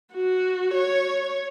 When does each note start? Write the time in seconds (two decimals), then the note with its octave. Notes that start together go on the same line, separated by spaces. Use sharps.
0.15 F#4
0.74 C#5